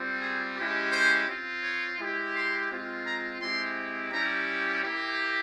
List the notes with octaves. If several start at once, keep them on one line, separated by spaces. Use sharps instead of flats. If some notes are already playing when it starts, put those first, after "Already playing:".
Already playing: G3 C4 F4
G#4
G#3 C#4 E4 G4
C5
C4 F4
C#5
G#3 E4 G4
C6
G#3 C4 F4
A#5
G#3 C4 E4 G4 C6
G3 C#4 E4 G4 A#5
A#3 E4 G4